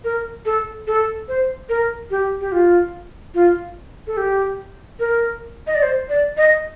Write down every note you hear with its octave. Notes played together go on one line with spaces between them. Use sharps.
A#4
A4
A4
C5
A#4
G4
G4
F4
F4
A4
G4
A#4
D#5
D5
C5
D5
D#5